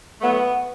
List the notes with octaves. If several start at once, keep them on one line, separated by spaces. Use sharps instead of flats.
A2 F#3 A3 B3